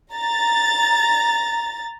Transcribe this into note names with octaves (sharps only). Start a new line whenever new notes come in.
A#5 A6